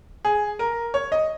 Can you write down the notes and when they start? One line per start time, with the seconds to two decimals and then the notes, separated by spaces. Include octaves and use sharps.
0.25 G#4
0.59 A#4
0.94 C#5
1.12 D#5